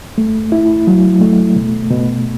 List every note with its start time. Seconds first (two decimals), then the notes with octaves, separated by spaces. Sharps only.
0.18 A3
0.52 E4
0.87 F#3
1.21 A3
1.56 B2
1.91 B2